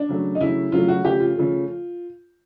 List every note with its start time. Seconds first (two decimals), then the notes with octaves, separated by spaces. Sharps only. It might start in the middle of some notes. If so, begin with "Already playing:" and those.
Already playing: D4
0.09 C#3 F#3 A3
0.35 D#4
0.41 C#3 F#3 A3 E4
0.72 C#3 F#3 A3 F4
0.88 F#4
1.04 C#3 F3 A3 G4
1.20 F4
1.37 C#3 F3 A3